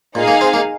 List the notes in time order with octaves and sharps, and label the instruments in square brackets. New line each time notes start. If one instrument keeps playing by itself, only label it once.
[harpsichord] A#2 [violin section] D#4 G#4 F5
[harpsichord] A#3
C4
A#3